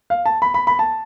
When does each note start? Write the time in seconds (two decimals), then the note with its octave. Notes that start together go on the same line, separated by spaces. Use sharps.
0.10 F5
0.26 A5
0.42 B5
0.54 B5
0.67 B5
0.79 A5